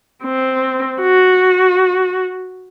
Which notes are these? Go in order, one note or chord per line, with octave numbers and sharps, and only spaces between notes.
C4
F#4